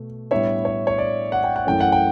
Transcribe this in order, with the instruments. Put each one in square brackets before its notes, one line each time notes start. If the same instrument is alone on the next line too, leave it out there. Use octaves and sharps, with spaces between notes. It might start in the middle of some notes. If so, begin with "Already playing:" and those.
Already playing: [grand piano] B2 A3
A2 G3 B3 D4 C#5 E5
C#5
C#5
D5
F#5
G5
F#5
F#2 E3 A3 C#4 G5
F#5
G5